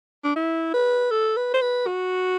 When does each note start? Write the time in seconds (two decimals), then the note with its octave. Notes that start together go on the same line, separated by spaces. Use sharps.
0.24 D4
0.36 E4
0.74 B4
1.11 A4
1.37 B4
1.54 C5
1.62 B4
1.87 F#4